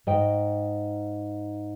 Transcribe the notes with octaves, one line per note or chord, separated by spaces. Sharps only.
G#2 D#5 G5